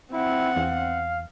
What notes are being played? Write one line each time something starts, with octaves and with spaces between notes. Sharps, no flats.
C4 E4 F#5
E2 F5